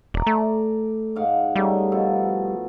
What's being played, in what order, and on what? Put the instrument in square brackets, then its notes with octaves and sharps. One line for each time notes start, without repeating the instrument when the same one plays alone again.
[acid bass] E1 [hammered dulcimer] D5 A#5
[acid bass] A3
[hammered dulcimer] G#2 F5 F#5
[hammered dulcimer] C#3 A3 D#4 [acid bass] G3
[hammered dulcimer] B2 F3 A4